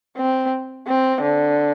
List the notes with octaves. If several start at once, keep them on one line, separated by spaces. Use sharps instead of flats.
C4
C4
D3